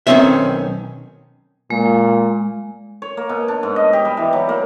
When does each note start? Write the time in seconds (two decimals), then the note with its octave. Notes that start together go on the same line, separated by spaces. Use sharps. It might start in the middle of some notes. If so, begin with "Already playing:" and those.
0.07 B1 D#3 F#3 C4 C#4 E5
1.70 A#2 G#3
3.02 C#5
3.17 A#3
3.29 B2
3.48 D4
3.63 G#2
3.76 D#5
3.93 G4
4.05 G3
4.17 E3
4.33 F#3
4.49 A#3